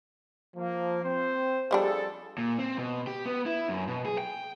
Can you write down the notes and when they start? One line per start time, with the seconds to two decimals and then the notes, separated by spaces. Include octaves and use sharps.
0.56 F3 A#3
1.03 C4 C5
1.71 F3 G3 D4 G#4 A4
2.38 A#2
2.59 C4
2.78 B2
3.07 G4
3.26 B3
3.46 E4
3.69 F#2
3.87 B2
4.06 G#4
4.18 G5